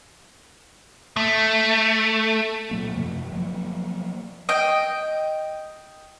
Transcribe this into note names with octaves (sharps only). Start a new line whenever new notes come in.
A3
A#2 F#3 A#3
F#2 C3 F3 A3
F3 F#3 A#3
D#5 G5